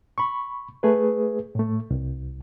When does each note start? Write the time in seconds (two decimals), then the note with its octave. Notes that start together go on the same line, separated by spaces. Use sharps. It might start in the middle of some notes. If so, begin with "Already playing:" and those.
0.18 B5 C#6
0.83 A3 G#4 B4
1.55 A2 A3
1.91 C2